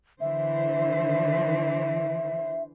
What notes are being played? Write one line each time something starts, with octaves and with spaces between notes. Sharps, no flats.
D3 E3 C5 E5